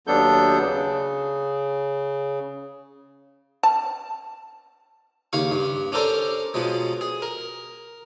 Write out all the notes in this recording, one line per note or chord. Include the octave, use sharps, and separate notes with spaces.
D#2 F#3 B3 D4 A4 G6
C#3
A5
D#2 C#3 F5 C#6
G2
C#4 D4 A4 A#4 C5 D5
B2 F3 F#3 G#3
G#4
A#4